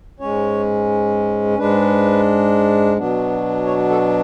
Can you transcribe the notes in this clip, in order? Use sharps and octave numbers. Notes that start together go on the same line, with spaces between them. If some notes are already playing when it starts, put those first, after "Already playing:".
G#2 G#3 C#4 C#5
G#2 G#3 D4 B4
B2 F#3 B3 D4
C#5
A4